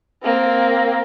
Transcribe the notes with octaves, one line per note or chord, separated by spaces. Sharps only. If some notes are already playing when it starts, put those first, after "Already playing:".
A#3 C4